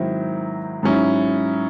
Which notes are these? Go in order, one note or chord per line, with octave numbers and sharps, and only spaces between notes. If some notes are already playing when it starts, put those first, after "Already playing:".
Already playing: G#2 D#3 F#3 C4 E4
G#2 F#3 C#4 E4